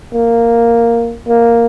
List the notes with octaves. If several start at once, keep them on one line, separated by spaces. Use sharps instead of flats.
A#3
A#3